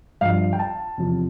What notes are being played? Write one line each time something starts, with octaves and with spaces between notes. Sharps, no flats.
G2 F3 F5
G5
A5
E2 C3 F3